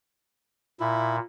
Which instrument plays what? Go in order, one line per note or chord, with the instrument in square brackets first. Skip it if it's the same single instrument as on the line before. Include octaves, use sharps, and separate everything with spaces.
[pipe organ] A#2 [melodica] E4